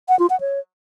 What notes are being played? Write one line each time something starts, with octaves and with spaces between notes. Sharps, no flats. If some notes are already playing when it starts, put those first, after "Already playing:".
F#5
F4
F#5
C#5